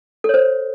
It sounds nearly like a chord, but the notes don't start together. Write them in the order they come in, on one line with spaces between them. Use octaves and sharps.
A4 C#5 C5